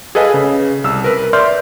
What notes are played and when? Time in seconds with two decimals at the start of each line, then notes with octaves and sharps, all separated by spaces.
0.15 G#4 A4 B4 D#5 F5 G#5
0.34 C#3
0.84 C2 E6
1.04 A#4 B4
1.33 D5 E5 C6 F6 G6